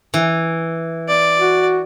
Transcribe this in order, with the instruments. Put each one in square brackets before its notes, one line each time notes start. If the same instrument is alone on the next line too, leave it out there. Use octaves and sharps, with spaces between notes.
[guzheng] E3
[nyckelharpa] D5
[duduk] F#4